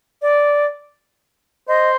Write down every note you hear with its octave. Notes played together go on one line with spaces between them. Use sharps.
D5
C5 D#5